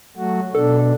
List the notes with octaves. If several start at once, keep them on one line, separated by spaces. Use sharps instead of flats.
F#3 A3 F#4
B2 D4 A4